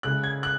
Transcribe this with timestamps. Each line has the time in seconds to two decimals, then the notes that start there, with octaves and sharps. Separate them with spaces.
0.03 C#3 G#3 F#6
0.24 G#6
0.43 F#6